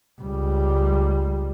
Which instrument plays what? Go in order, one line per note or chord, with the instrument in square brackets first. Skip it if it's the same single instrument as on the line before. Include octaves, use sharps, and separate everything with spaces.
[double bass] C#2 G3